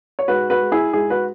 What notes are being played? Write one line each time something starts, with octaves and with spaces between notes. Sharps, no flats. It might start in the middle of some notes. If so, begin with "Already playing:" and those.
C#5
G#2 F#4 B4
F#4 B4
G#3
E4 G#4
G#2 E4 G#4
F#4 B4